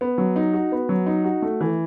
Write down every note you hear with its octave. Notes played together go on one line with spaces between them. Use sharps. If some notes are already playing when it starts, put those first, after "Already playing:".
B3
F#3
D#4
F#4
B3
F#3
D#4
F#4
A3
E3